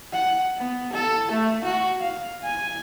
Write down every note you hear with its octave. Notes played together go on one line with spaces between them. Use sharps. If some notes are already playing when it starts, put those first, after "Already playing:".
F#5
B3
A4
A3
F#4
F5
G#5